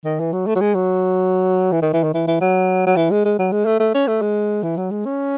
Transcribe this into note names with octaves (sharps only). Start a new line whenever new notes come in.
D#3
E3
F#3
A3
F#3
G#3
F#3
E3
D#3
E3
D#3
E3
E3
F#3
F#3
E3
G#3
G#3
F#3
G#3
A3
A3
C#4
A3
G#3
E3
F#3
G#3
C#4